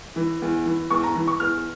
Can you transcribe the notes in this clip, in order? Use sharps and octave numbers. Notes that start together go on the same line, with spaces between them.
E3
E2
E3
E2 C#6
A#5
E3
C#6
E2 F6